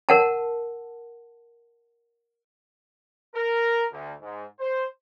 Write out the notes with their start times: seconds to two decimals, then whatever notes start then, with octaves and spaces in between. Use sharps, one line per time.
0.09 A#4 F#5 A5
3.35 A#4
3.92 D2
4.21 G#2
4.59 C5